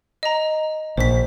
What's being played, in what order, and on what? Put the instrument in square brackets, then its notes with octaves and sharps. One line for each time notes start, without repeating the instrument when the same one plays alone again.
[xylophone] D#5 A#5
[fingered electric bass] A#1 [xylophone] C5 B6